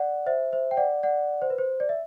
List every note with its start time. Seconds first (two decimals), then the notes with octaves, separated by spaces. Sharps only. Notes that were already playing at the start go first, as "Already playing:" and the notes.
Already playing: D5 F#5
0.26 C5 E5
0.52 C5 E5
0.71 G5
0.77 D5 F#5
1.03 D5 F#5
1.42 C5
1.50 B4
1.58 C5
1.80 D5
1.89 E5